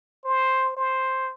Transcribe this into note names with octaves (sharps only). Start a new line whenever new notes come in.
C5
C5